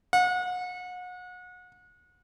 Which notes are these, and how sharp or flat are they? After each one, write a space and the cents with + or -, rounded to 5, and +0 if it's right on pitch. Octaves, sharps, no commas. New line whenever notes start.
F#5 -35